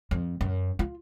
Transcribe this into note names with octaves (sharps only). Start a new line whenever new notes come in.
F2
F#2
F4